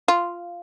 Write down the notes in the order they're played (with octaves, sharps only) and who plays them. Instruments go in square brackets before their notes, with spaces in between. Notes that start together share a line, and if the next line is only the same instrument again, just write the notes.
[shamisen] F4